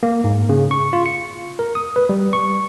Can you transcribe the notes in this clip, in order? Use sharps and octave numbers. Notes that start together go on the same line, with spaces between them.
A#3
G#2
C#3
C#6
F4
C#7
A#4
D#6
B4
G3
C#6